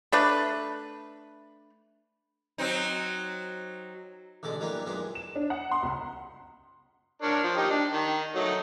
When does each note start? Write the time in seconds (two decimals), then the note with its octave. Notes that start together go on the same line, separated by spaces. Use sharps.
0.12 A3 D4 B4
2.58 F#3 C4 D#4
4.43 A1 B2 D3 G#3 D5
4.60 E3 F#3 G3 A#3 C#4 D4
4.86 F#2 A#2 G#3 B3 D4
5.15 E7
5.36 D4
5.50 F#5
5.71 C6
5.83 C#2
7.22 D4 A#4 C#5
7.44 F3
7.57 D#4 G4
7.71 D4
7.93 D#3
8.36 F#3 A3 D#4